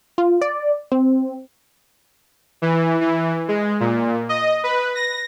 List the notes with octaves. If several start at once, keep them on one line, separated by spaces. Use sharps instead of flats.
F4
D5
C4
E3
E3
G#3
A#2
D#5
B4
A#6